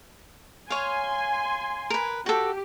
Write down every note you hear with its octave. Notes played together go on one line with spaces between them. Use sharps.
C#5 F5 G#5 C6
A#4 B4
F#4 G4 A4